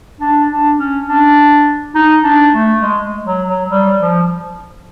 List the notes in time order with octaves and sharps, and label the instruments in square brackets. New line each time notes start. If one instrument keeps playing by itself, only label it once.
[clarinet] D4
D4
C#4
D4
D#4
D4
A3
G#3
F#3
F#3
G3
F3